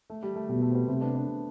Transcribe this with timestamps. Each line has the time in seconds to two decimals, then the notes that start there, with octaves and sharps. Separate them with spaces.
0.10 A3
0.23 G3
0.36 A3
0.49 B2 G3
0.62 A3
0.71 C4
0.75 G3 B3
0.88 C3 A3 C4
1.01 B3 D4
1.15 B3 D4